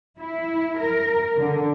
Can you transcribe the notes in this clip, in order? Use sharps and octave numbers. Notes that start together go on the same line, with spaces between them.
E4
A#4
D3